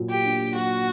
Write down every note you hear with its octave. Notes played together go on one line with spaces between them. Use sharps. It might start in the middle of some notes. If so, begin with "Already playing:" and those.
Already playing: A#2 F#3
G4
D4
F#3 F#4